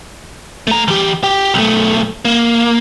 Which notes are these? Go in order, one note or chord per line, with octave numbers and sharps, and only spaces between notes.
A3 A#5
E3 G4
G4
B1 A3
A#3